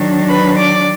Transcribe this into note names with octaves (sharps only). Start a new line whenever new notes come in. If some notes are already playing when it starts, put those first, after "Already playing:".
Already playing: D#3 F#3 D4
B4 B5
D5 D6